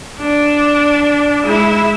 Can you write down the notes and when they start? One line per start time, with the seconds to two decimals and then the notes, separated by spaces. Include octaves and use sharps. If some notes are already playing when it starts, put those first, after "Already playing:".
0.20 D4
1.44 G#3 E4